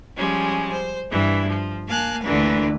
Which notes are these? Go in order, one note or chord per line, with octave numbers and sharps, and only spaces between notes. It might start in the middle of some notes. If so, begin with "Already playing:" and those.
F3 G3 G#3 C#4
C5
G2 E3 E4
F3
A#3 F5 G#5 A5 F#6
D2 A#2 D3 E3 B4